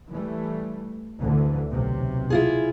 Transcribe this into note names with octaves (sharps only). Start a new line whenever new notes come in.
E3 G3 A3
D2 D3 E3
B1 C3
E4 F4 G#4